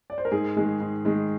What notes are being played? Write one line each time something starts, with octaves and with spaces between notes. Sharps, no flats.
D5
C5
A#4
G#2 G#4
D#3 G#3
G#2
D#3 G#3